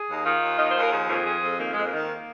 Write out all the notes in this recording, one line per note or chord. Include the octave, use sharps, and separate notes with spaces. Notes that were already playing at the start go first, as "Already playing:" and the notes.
Already playing: G#4
D#2 D#4
D#3 F4
D#2
D#3 D#5
C5
D#2 A#4
F3 G#4
F2
F3 G#4
F2
D#3 A#3
F2 G#3
A#3
D#3